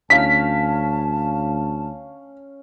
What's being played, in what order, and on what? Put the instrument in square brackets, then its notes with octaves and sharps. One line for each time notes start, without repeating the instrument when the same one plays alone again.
[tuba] D2 [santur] C#4 F5 [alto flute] A5 [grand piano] B6